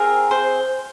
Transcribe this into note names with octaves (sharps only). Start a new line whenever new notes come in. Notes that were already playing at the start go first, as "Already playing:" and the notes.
Already playing: C4 F4 G#4 A#4
C5